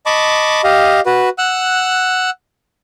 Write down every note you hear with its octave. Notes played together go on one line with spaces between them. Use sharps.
D#5 A5 B5 C#6 D6
G4 D#5 F5
F#4 B4
F#5 E6 F#6